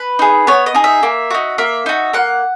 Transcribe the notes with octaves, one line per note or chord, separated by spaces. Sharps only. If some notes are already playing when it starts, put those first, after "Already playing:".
Already playing: B4
D#4 G#4
B3 C#5
D#5
D#4 G#4
E5
A#3
D#4 F#4
A#3 E5
D#4 F#4
A#3 F#5